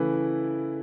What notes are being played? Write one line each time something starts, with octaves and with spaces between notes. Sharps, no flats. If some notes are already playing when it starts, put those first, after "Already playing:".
Already playing: C#3 E3 A3 E4 B4